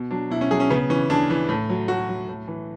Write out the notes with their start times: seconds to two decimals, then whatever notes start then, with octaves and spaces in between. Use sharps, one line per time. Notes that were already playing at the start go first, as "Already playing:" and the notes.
Already playing: B2
0.11 F#3 D4
0.30 B2 E4
0.41 C#4
0.51 F#3 G#4
0.60 C#4
0.70 C#3 B3
0.90 E3 C#4
1.10 C#3 D4
1.30 E3
1.49 A2
1.70 F#3
1.88 A2 F#4
2.09 F#3
2.29 A2
2.48 E3